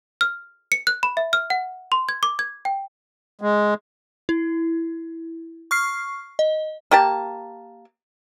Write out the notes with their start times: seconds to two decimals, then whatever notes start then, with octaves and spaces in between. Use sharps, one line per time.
0.21 F6
0.72 C#7
0.87 F#6
1.03 B5
1.17 E5
1.33 F6
1.50 F#5
1.92 C6
2.09 G#6
2.23 D6
2.39 G#6
2.65 G5
3.41 G#3
4.29 E4
5.71 C#6 F6 C7
6.39 D#5
6.91 A#3 G4 A5